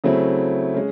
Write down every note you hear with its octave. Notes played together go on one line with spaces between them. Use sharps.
C#3 F#3 A3 C4 E4
G#3 C#4